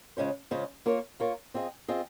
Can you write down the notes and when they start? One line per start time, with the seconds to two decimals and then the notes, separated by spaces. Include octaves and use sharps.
0.17 C#3 G#3 C#4 F4 C5
0.51 C#3 G#3 C#4 F4 C5
0.86 A#3 F4 A#4 C#5
1.20 A#3 F4 A#4 C#5
1.54 C4 F4 G#4 D#5
1.88 C4 F4 G#4 D#5